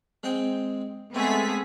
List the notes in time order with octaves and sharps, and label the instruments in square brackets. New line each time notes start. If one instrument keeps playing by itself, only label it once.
[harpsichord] G#3 C4 G5
[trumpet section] G#3 A3 [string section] B3 G#4 B6 [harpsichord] C4